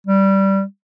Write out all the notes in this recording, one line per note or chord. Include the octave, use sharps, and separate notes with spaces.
G3